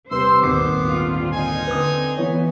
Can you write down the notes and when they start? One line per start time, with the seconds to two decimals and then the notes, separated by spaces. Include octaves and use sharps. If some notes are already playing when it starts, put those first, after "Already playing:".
0.11 C3 G3 B4 C5 C6 E6
0.42 D#1 G#1 B3 D6 C7
0.86 D3 C4 F4
1.33 D#4 D#5 G#5
1.67 D3 C4 B4 D#6
2.18 E3 B3 E4 C#5